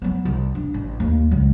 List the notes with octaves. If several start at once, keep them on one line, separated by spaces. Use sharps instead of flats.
F#3 B3
C2
D4
A1
D#2
C#2 F#3